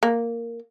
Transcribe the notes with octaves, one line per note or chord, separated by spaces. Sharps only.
A#3